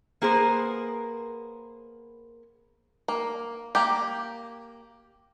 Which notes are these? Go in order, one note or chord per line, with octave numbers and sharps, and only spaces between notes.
A#3 B3 G#4 A#4 C5
A#3
A#3 G4